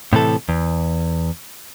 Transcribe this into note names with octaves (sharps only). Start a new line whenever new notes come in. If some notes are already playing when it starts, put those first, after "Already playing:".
A2 C3 E3 A4
E2